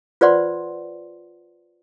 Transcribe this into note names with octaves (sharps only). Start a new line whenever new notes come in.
F4 B4 C5 D5 F#5 C6